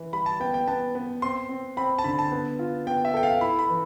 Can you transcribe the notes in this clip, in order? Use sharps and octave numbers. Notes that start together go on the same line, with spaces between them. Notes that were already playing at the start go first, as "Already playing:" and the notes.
Already playing: E3
G3 B5
A5
B3 G5
G5
B3 A5
B3
C4 C6
C4
C4 B5
A5
D3 B5
A5
B3
F4
B3 G5
E5
A4 G5
F5
E4 B5
B5
E3